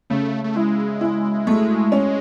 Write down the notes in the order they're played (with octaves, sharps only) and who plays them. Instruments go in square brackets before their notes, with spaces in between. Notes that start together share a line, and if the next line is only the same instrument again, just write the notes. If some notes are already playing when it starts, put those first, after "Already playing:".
[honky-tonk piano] C#3 [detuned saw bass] A3
[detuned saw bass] A3
[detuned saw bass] G#3 [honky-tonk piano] E4
[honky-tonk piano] E4
A3
C#4